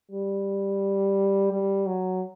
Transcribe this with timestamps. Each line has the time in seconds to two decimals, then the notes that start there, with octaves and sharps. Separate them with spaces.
0.11 G3
1.52 G3
1.86 F#3